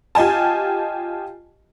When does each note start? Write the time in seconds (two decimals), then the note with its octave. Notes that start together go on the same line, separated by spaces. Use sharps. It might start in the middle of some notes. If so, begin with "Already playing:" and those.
0.15 F4 G4 D#5 G#5 A5